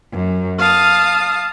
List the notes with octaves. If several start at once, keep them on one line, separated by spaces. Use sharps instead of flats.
F#2
F5 A5 D#6